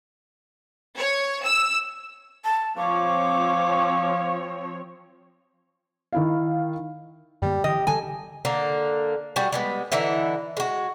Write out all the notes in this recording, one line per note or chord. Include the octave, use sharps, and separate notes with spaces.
C#5
E6
A5
F3 C4 C#5 F5 D6
D#3 E4 F5
F#2 D3 G3 A#3
D3 E3 G4 D#5
D3 D#3 G3 A4 G#5
D3 A#3
G3 F#4 G#4
G3 G#3 B3
D3 E3 D#4 E4
G#3 F#4